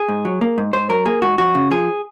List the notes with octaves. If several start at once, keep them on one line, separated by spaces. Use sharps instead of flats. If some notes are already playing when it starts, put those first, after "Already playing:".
Already playing: G#4
G#2
F#3
A#3
G#2
G#2 C5
F#3 A#4
A#3 G#4
G#2 F#4
F2 F#4
C#3
F3 G#4